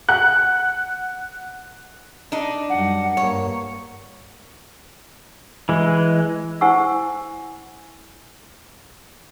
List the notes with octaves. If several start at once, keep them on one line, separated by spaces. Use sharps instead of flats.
F#5 F#6
D4 D#4
F#2 G3 F#5
G2 A#3 C#5
E3 G#3
E4 C5 F#5 G#5 C#6 E6